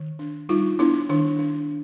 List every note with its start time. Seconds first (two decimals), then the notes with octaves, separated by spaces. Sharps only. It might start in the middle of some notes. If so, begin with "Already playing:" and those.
Already playing: D#3
0.19 D4
0.49 G3 D#4 F4
0.79 B3 D4 E4
1.09 D#3 D4
1.39 D4